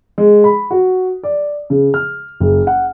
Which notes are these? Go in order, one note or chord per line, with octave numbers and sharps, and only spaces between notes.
G#3
B5
F#4
D5
C#3
F6
F#1
F#5